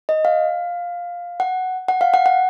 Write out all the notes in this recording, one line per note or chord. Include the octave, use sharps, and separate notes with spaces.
D#5
F5
F#5
F#5
F5
F#5
F#5